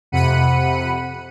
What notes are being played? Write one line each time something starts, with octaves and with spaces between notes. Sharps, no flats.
F2 C3 F#5 B5 C#7 D#7